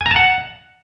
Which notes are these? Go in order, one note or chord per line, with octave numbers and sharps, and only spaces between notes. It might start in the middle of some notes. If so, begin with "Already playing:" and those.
G#5
A#5
A5
F#5